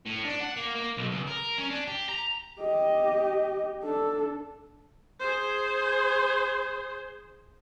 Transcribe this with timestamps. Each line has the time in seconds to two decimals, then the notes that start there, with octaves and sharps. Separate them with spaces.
0.06 A2
0.25 D4
0.40 F#5
0.56 A#3
0.75 A#3
0.97 B1
1.11 C#2
1.27 A#4
1.58 C#4
1.70 D4
1.87 G4
2.09 A#5
2.60 G4 D#5
3.83 D4 A4
5.20 G#4 C5